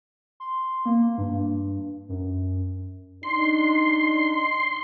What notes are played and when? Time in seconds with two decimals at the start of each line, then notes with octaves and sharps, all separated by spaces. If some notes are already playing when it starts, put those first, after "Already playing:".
0.40 C6
0.86 A#3
1.18 G2
2.09 F#2
3.23 D4 D#4 C6